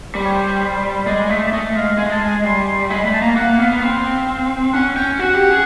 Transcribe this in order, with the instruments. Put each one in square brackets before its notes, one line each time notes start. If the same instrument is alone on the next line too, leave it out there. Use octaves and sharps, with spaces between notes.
[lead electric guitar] G3 [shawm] C5
[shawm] C#5
C5
[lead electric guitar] G#3 [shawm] D5
[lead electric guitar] A3
[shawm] D5
[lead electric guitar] A3 [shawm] D#5
[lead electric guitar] G#3 [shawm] F5
[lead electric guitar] G#3 [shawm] G#5
[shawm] A5
G#5
[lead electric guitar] G3 [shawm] C6
[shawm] C6
[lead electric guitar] G#3 [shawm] B5
[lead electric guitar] A3 [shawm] B5
[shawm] A5
[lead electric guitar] A#3 [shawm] A#5
[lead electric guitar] A#3 [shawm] F#5
[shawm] F#5
[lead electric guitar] B3 [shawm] F5
[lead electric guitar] C4
[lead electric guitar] C#4 [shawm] F#5
[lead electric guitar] C#4 [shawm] G5
[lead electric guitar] F#4 [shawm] F#5
[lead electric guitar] G4
G#4